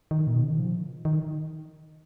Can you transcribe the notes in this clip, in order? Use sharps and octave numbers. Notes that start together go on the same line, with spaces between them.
D#3
A#2
B2
C#3
D#3
F3
D#3